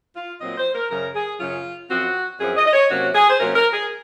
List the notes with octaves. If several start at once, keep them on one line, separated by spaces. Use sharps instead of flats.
F4
A#2 F#3 C4 F4 D#5
C5
A#4
F#2 C#3 F#3 C#4 A#4
G#4
F#2 C#3 F#3 C#4 F4
F#2 F3 C4 F#4
F#2 F3 C4 G#4
D#5
D#5
C#5
C3 F#3 A#3 C#4 F#4
G#4
C5
C3 F#3 A#3 C#4 A#4
A#4
G#4